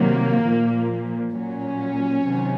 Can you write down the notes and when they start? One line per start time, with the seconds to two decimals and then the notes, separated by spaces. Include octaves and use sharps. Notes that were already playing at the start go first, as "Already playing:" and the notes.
Already playing: C3 D#3 F#3 A#3
0.45 A#2 F3
1.35 A#2 F#3 C#4
2.27 C3 D#3 F#3